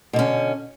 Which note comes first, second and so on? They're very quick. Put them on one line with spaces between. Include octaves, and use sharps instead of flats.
B2 D3 C#4